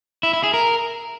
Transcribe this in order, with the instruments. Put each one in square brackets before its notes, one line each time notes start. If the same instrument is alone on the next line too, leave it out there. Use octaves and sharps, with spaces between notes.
[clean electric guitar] E4
E4
G#4
A#4